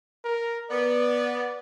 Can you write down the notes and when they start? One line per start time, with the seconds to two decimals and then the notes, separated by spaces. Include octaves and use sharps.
0.24 A#4
0.71 B3 D5